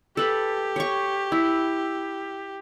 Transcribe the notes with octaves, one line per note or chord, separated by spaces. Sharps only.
G4 A4 B4
C#5 C#6
E4